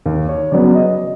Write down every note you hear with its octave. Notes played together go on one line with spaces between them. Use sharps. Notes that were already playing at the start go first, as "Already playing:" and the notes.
D#2
C#5
C#3 F#3 B3 D5
D#5